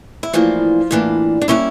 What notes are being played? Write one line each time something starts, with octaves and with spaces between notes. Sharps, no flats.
E4
A2 E3 F3 A#3 D4 F4
A2 E3 A#3 D4
D4
E3 G3 A#3 C#4 E4